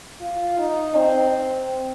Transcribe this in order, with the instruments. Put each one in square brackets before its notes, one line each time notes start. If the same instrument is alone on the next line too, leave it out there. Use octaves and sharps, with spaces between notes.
[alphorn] F4
D#4
C4